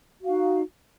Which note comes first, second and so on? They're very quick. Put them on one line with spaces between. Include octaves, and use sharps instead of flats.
F#4 F5 D#4